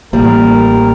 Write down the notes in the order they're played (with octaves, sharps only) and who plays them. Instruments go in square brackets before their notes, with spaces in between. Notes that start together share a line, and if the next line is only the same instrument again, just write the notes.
[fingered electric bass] A1 [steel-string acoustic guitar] G3 [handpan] A#3 [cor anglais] A#4